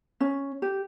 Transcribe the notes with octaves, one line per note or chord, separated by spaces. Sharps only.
C#4
G4